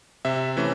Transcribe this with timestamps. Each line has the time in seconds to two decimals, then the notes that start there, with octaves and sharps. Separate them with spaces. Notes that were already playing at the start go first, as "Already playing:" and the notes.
0.25 C3 E5
0.57 E3 A3 C#4